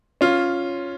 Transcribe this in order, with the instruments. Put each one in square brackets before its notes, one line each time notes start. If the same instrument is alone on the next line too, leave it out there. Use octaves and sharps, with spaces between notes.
[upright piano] C#4 F4